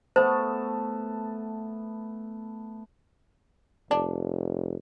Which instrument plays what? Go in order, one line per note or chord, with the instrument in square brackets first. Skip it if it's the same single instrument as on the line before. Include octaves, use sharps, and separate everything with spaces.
[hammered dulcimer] A3 B3 A5 [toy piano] C5
[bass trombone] F1 [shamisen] D4